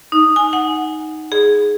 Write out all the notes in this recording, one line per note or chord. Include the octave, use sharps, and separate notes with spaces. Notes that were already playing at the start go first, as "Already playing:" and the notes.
D#4
G#5
F#5
G#4